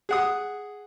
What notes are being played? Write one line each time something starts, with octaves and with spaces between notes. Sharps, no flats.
G#4 F#5 D#6